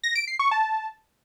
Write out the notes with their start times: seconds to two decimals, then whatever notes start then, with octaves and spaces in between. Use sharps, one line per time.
0.04 A#6
0.15 D7
0.27 C7
0.39 C#6
0.51 A5